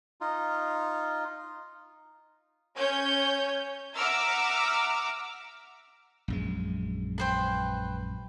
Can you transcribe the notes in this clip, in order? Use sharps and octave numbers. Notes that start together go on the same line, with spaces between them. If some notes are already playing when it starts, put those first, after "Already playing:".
D#4 F4
C#4 C#5 G6
E5 F#5 A#5 D6 E6 F6
A#1 F#2 G#3
B4 C5 G5